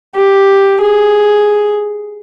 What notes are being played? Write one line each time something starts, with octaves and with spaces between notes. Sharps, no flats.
G4
G#4